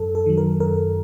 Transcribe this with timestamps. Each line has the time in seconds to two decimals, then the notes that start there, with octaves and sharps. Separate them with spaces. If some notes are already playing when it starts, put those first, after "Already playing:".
Already playing: F#2 A4
0.15 A4
0.26 D#3 F#3
0.38 A#4
0.60 F#2 A#4